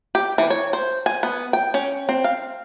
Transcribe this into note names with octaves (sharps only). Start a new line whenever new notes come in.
G4
E3
C#5
C5
G#5
B3
G5
C#4
C4
F5